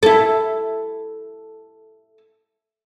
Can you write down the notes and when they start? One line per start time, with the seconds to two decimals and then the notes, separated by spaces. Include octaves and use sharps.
0.03 E4 A4